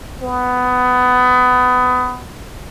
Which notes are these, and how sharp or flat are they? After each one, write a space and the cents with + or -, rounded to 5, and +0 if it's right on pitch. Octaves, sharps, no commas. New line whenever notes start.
B3 +20